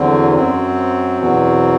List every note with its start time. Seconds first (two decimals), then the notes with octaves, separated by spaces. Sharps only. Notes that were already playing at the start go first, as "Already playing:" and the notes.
Already playing: E2 D3 F#3 C4
0.36 F#2 F#3 C4
1.20 E2 B2 F#3